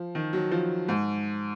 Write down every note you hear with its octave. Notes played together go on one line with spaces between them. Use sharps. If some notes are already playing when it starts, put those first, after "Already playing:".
Already playing: F3
D#3
F#3
F3
G#2